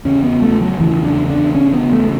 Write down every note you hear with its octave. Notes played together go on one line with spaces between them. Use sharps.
E2 C#3 C#4
B3
A3
F#3
E2 C#3 E3
D4
D4
E2 C#3 C#4
B3
A3